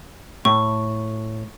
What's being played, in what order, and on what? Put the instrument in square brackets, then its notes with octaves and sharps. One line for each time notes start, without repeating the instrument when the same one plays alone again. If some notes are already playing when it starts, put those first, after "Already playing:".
[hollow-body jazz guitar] A2 [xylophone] C#6